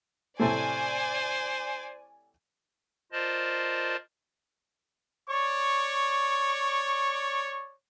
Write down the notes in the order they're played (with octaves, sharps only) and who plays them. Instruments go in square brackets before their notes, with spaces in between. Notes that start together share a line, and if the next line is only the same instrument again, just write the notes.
[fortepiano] A2 C3 A3 [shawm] C5 [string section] D5 G#5
[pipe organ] F4 A#4 C5 D5 D#5 A5
[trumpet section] C#5 D5 C#6